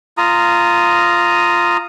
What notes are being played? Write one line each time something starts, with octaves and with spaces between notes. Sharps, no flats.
F4 A#5 D#6